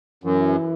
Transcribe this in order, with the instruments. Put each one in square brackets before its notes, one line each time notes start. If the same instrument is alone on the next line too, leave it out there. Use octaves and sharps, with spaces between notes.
[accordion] F#2 [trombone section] E3